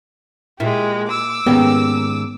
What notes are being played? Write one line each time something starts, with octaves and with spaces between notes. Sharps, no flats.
A#2 G#3 E4 G4
D6 E6
G#2 D#3 A#3 B3 C#4 G4